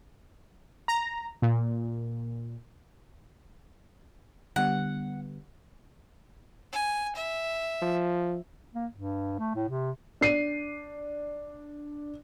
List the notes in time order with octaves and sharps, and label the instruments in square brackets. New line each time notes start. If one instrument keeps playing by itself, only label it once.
[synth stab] A#5
A#2
[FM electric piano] D3 G3 B3 [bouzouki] F#5
[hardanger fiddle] G#5
E5
[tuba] F3
[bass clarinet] A#3
G2
A3
A2
C3
[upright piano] D4 C7 D#7